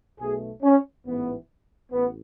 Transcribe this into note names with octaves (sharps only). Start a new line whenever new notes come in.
B1 B2 A3 G#4
C#4
A1 G#2 E3 B3
A1 B3